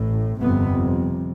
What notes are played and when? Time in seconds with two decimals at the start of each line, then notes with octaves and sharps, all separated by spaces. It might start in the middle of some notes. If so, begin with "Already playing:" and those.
Already playing: A1 A2
0.40 G1 F2 C3 B3